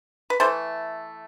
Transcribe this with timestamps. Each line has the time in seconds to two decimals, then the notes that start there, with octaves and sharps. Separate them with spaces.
0.30 B4
0.40 E3 A3 A4 C5